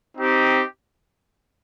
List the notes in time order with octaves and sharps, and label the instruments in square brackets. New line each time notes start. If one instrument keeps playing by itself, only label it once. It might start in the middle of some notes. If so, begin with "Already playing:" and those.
[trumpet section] C4 D#4 G4